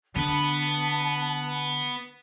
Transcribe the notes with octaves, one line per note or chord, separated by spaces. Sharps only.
D3 B3 B4 A5